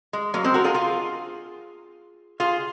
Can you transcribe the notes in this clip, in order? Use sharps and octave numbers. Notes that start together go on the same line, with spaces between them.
G#3
F#3 A#3
G#3 C4
F#4 A#4
F4 G#4
F4 G#4
F4 G#4